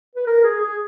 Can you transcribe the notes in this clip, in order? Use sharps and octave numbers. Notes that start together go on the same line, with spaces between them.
B4
A#4
G#4
G#4